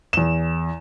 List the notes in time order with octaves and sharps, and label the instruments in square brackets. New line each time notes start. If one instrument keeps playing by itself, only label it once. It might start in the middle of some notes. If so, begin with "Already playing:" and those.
[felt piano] E2 E7